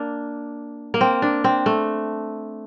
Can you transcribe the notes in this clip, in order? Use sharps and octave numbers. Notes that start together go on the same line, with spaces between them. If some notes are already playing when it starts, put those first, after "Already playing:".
Already playing: A#3 D4
A#3
C4
D4
C4
A3